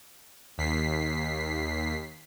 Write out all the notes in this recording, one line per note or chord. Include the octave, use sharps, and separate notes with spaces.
D#2 B6 C7